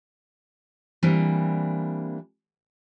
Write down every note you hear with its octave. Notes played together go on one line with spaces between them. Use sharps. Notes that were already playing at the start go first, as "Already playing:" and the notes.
E3 G3 A#3 C4 D4